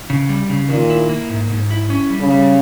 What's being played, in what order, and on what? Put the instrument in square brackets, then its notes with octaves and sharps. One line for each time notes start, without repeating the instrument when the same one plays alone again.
[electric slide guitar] C#3
G3
C#3
[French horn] A#2 [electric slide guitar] D#3
[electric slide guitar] E4
A#3
G#2
G#2
E4
C#4
G3
[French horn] C#3
[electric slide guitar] G3